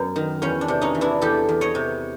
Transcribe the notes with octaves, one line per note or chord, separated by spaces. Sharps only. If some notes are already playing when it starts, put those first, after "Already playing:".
Already playing: F#2 B3
D#3
E2 C#4
D4
C3
C#4 D#4
E3
D4 E4
E2 G4 A4
E2
C#5 D#5
C3